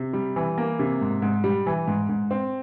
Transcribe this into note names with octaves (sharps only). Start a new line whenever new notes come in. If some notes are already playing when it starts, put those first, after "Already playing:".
Already playing: C3
G3
E3
A#3
C3
G#2
G#2
G3
E3
G#2
G#2
C4